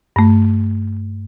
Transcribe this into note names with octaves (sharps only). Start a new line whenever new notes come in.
G2 A3